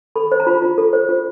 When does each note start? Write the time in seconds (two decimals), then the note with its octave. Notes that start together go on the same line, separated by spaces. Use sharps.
0.16 A4 B5
0.32 C5
0.40 A#5
0.47 F4 B5
0.62 F4
0.78 A4
0.93 C5
1.09 F4